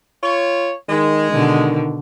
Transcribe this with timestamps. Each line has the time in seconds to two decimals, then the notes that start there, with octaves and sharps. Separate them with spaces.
0.23 F4 C#5
0.89 D#3 G#3
1.31 B2 D3 D#3